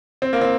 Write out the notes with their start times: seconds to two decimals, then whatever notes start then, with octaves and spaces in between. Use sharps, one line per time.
0.22 C4
0.33 A#3
0.41 C4